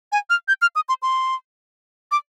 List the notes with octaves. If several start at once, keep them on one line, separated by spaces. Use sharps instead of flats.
G#5
F6
G6
F6
D#6
C6
C6
D6